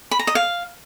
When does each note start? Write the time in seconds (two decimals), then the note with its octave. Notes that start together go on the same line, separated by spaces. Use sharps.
0.11 B5
0.19 A#5
0.27 D#5
0.35 F5